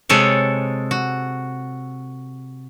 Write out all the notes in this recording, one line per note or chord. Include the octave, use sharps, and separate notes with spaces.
C3 G#3 A4 C#5
F#4